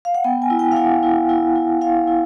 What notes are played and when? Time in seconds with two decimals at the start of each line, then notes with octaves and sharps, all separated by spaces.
0.05 F5
0.15 F#5
0.24 B3 G5
0.42 G#5
0.50 E4
0.59 G5
0.72 F5
0.76 E4 F#5
1.03 E4
1.29 E4
1.55 E4
1.81 E4 F5
2.07 E4